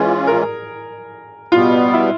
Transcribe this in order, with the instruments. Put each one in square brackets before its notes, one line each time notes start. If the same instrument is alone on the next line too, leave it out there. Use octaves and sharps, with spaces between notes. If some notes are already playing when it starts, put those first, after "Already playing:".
Already playing: [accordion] E3 G#3 C#4 F4 [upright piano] G#4
[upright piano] A#4
[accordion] B2 G3 B3 [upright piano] F4
[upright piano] E4